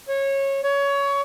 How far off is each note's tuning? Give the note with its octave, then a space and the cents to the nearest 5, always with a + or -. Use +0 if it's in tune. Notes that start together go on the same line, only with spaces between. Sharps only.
C#5 -20
C#5 +20